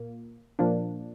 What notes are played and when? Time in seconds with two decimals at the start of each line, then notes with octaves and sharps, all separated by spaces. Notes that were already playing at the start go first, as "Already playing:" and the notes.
Already playing: A#2 A#3
0.59 A#2 F3 A#3 D4